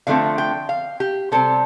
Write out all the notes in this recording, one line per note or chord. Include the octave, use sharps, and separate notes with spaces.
D3 F3 A3 C4 F5
G5
F5
G4
C3 G3 C4 A4